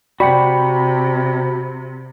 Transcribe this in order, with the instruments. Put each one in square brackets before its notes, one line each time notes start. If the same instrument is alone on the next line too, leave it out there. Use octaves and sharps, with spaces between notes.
[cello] C3 [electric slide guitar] F#4 F#5 [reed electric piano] D5 G5 [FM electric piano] B5